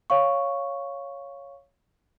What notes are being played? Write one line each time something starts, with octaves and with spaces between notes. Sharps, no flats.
C#5 F5 C#6